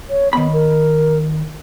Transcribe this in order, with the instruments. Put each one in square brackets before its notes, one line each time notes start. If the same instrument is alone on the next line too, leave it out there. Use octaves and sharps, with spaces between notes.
[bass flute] C#5
[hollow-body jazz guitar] D#3 B5 [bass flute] B3
[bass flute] A#4